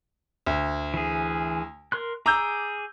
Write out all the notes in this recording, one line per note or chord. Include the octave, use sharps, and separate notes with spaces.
D2
E3 G#4
A#4 C6 F#6
G#4 A#5 D6 E6 G6